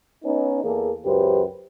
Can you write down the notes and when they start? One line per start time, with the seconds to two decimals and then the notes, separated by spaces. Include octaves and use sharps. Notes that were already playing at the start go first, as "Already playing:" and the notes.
0.25 B3 C#4 D#4
0.64 E2 A#3 G#4 A4
1.05 C#2 F#2 G4 B4 C5